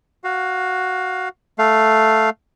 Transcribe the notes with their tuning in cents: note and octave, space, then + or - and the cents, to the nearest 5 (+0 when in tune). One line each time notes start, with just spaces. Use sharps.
F#4 +0 F5 +15
A3 +0 F5 +0